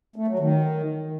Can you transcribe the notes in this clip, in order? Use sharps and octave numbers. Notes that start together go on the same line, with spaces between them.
A3
F#3
D#3